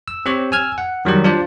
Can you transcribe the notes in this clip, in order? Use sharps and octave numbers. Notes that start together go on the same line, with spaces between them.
E6
C4 G4 C#5
G#5 E6 F6 G#6
F#5
D#3 F#3 G3 G4
D4 F4 C5 D5